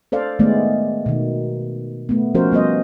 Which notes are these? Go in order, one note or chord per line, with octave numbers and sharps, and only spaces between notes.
A4 C5 D5 F5
D#3 G#3 A3 B3 D5
B2 D#3
A3 B3
F3 C#4 F#4 A#4 C5
G3 B3 C5 D#5